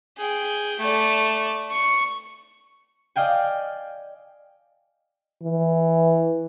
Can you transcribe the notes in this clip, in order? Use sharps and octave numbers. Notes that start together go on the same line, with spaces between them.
G#4 G5
A3 D5
C#6
D5 D#5 F5 G5 G#5
E3